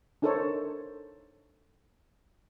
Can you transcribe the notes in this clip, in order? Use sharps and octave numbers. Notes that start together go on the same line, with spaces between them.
D4 D#4 A4 A#4 C5 C#5